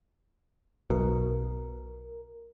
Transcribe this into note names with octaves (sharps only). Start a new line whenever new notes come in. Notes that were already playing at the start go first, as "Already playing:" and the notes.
B1 B2 A#4